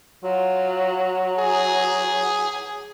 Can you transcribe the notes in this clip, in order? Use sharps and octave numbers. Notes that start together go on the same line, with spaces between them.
F#3 F4
G#4